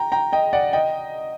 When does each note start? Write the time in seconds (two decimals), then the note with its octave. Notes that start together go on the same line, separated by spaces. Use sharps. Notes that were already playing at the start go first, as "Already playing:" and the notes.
Already playing: G5 A#5
0.12 G5 A#5
0.32 D#5 G5
0.53 D5 F#5
0.73 D#5 G5